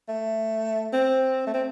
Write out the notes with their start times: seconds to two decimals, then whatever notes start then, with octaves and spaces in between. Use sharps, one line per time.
0.09 A3
0.93 C4
1.47 A3
1.54 C4